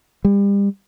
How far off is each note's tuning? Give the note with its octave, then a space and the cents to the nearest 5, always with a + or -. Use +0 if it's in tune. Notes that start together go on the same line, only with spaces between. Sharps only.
G3 +35